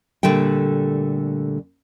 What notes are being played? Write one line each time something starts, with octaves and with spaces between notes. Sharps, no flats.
A#2 D3 G3 A3 G5